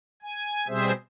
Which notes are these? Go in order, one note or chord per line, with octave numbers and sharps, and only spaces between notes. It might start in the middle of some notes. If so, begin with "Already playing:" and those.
G#5
B2 G3 C4 G#4 C5 E5